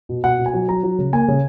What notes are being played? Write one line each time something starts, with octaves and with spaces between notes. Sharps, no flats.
B2
B2 F#5
B2
G#5
F#3
F#3 A#5
F#3
C#3
A#3 G#5
C#3